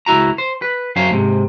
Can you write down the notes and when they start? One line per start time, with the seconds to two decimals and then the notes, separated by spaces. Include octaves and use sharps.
0.06 C#2 E4 F#4 A#5
0.38 C5
0.62 B4
0.96 F#2 F#3 C#4 C5 F5
1.11 G#2 C3